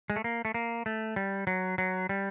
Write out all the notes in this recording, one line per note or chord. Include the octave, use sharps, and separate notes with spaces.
G#3
A3
A#3
A3
A#3
A3
G3
F#3
F#3
G3